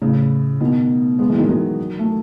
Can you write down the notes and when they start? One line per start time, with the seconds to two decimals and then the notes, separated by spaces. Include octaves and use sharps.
0.02 A2 C#3
0.60 B2 D#3
1.19 G#3 B3
1.29 E3 G#3
1.38 D#3 F#3
1.49 D#3 F#3
1.99 A3